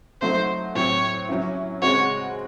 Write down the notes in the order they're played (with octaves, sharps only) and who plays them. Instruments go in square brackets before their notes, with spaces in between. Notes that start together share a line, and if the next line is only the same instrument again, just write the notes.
[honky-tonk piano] F#3 A3 D#4 F#4 [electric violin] C5
[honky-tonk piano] A2 F#3 C4 [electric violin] C#5
[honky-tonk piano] F#3 C#4 E4
[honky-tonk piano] C#3 G#3 C4 F#4 [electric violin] C#5